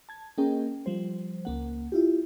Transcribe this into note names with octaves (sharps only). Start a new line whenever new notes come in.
A5 G#6
A#3 C#4 G#4 A#4 D#5 G5
F3 G3 C5
C#2 A#3 F#5
E4 F4 G4